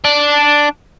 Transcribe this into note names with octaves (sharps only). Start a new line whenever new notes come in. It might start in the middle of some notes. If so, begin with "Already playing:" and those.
D4